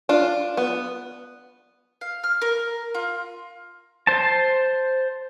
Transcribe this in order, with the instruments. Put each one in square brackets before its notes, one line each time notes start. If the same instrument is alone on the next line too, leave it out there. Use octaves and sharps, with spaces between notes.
[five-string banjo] D4 F4
B3
[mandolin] F5
F6
A#4
F4
[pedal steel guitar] C5 A5